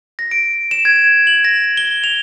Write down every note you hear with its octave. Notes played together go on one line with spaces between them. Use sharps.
A#6
D7
E7
G#6
F#7
A#6
G7
F7